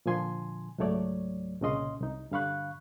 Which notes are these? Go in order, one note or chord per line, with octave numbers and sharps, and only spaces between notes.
A#2 D3 F3 G#5 C6
C#2 G#2 F#3 A3 C#5 D5
C2 A#2 C#3 C#4 D#5 C6
C2 D#4
G2 D3 F5 B5 C#6 F#6